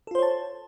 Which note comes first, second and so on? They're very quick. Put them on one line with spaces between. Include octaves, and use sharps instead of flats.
A4 F4 C5 C#5 A5